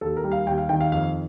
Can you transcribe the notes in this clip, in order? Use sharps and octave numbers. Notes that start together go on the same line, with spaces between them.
D#2 A4
A#4
G3
F5
D#2 G5
F5
D#3 G5
F5
F2 F5